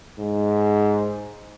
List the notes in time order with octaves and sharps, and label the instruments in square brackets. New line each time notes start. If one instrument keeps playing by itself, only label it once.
[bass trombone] G#2